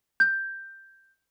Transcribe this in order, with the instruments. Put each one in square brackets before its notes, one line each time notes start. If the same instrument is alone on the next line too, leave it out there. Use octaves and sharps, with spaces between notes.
[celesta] G6